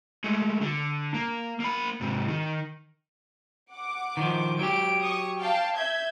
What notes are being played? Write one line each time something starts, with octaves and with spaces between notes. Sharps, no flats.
G#3 A3
D3
A#3
A#3 B5
G#2 C3
D#3
F#5 D6
D#3 F3
F#3 G4 D7
C#6 D#6
F5 G5 A5
E5 G6 G#6